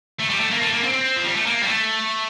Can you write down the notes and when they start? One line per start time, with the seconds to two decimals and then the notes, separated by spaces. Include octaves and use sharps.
0.20 A3
0.30 G3
0.40 A3
0.51 A#3
0.62 A3
0.73 A#3
0.83 C4
0.93 C4
1.16 F3
1.26 G3
1.36 A3
1.46 A#3
1.62 G3
1.67 A3